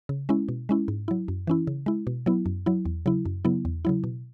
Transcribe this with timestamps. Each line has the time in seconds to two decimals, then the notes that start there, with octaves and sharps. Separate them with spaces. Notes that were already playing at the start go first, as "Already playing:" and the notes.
0.09 C#3
0.29 G#3 C#4 E4
0.49 B2
0.69 G#3 C#4 E4
0.88 G#2
1.08 F#3 E4
1.28 F#2
1.47 E3 C#4 E4
1.67 C#3
1.86 G#3 E4
2.07 B2
2.26 F#3 B3 E4
2.46 F#2
2.66 F#3 E4
2.86 E2
3.06 C#3 F#3 E4
3.26 F#2
3.45 C#3 F#3 B3 E4
3.65 E2
3.85 C#3 F#3 E4
4.04 B2